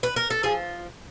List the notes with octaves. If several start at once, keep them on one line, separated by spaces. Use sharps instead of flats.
B4
A#4
A4
F3 G#4